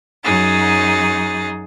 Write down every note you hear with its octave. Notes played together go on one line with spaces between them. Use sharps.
F#2 F#3 D#4 G#4 A6